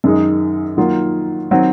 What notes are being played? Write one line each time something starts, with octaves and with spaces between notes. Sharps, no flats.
F#2 D#3 G#3 D#4
D#3 F#3 A#3 F4
D#3 F#3 C4